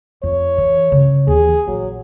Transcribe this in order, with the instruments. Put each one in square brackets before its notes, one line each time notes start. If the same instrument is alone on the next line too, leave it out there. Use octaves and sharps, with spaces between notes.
[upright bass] F2 [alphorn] C#5
[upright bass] E3
G2 C#3
[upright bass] D#2 E3 [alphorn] G#4
[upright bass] A#1 [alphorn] F#3